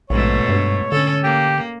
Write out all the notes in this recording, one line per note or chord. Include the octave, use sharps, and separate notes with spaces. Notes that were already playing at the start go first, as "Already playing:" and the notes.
A#1 G#2 B2 A3 C#5
G2
D3 C#4 A4
A#3 G4